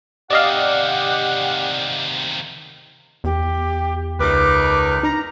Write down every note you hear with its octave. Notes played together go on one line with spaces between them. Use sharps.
C3 D#3 G4 D5 D#5 F5 F#5
E2 G4
C#2 D#4 A#4 B4 D6
D#4 A#5